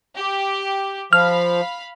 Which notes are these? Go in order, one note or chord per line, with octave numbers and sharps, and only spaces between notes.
G4
F3 F5 B5 F6